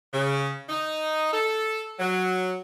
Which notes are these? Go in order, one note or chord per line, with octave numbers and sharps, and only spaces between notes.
C#3
D#4
A4
F#3